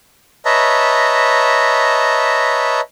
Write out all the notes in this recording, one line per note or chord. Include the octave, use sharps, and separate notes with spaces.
B4 C#5 D#5 E5 A5 A#5